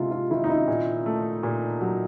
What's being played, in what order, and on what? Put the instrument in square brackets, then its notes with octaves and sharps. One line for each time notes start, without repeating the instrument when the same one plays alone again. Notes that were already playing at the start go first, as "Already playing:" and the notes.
Already playing: [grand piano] C3 G#3 [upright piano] E4 F4
[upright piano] F4
[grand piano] D#3 [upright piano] E4
[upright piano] D#4
E4
[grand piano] A#2
A3
A#2
F#3